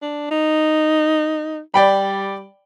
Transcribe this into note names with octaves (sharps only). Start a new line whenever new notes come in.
D4
D#4
G3 D5 G5 B5